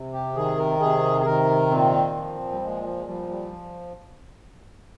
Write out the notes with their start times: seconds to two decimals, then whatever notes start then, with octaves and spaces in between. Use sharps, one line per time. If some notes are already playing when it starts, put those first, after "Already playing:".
Already playing: C3
0.13 G4
0.35 D#3 G#4
0.57 A#4
0.80 C3 G#4
1.21 G#4
1.25 D#3 A#4
1.71 A#2 C4
2.16 F3
2.52 G3
2.61 A#2 G#3
2.84 F3
2.96 G#3
3.06 F3 G3
3.29 G3